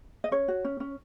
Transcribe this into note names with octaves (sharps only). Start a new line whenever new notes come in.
D#5
C#4 C#5
F#4
C#4
C#4